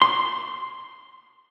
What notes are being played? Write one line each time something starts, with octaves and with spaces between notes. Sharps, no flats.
C6